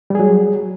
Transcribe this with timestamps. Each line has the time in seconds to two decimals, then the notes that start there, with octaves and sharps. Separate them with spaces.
0.10 G3
0.15 G#4
0.20 F#3